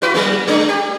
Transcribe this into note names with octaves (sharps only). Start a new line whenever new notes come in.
E4 F#4 B4
F#3 G#3 A#3
G#3 D4
G4